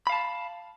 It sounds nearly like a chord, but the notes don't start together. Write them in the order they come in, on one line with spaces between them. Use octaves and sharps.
B5 F5 A5